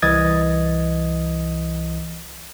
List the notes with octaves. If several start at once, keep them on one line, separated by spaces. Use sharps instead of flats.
C2 E3 D#5 D#6 G#6 A6